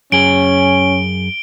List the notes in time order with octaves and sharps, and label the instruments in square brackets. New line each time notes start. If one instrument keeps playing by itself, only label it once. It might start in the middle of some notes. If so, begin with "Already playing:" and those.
[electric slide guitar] F#2 G#4 [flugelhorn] C#4 [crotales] D7 G7